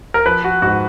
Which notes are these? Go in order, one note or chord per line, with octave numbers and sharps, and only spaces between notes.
A#4
F3 B4
F#4
G#2 F#4